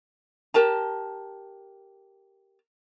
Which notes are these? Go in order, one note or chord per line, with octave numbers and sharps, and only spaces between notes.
G4 A#4 A5 A#5